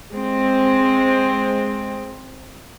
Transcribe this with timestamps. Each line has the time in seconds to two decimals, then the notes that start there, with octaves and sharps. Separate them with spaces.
0.13 G#3 C4